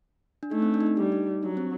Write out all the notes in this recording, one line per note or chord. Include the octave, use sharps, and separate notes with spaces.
D4
A3 D#4
C4
D4
D#4
D4
G3 D#4
D#4
F#3 D4
C4